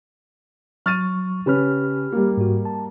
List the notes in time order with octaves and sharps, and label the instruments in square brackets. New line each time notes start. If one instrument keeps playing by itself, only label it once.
[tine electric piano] F#3 C#6 [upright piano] F6 A6 D#7
[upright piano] C#3 C#4 B4 [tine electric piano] G4 B5 F6
[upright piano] G3 A#3
[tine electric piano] G#2 F#4
A5